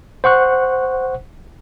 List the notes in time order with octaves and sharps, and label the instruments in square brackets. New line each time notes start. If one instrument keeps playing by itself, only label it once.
[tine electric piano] C5 F#5 C#6 F#6